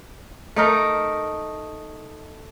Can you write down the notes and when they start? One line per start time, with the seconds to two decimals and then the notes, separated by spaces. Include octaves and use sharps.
0.56 A3 D#4 A#4